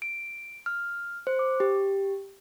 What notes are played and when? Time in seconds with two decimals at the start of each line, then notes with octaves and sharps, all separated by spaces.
0.02 D7
0.66 F6
1.27 C5
1.39 D6
1.60 G4